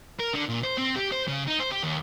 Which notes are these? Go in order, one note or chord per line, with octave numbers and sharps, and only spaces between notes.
A#4
D3
A#2
C5
C4
G4
C5
C#3
D#4
C5
G4
D#2